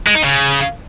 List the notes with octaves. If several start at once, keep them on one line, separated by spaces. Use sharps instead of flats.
G#3
D#4
C#3